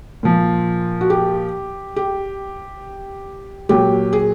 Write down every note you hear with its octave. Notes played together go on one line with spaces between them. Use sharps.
A#2 F3
F#4
G4
G4
A#2 F#3 G4
G#4